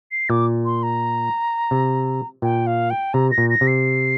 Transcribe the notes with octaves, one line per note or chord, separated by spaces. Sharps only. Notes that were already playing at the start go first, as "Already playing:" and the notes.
C7
A#2 D6
C6
A#5
C3
A#2 G5
F5
G5
C3 A#5
A#6
A#2
A#6
C3
C7